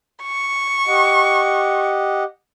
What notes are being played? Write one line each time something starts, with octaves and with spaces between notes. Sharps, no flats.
C#6
G4 D#5 F#5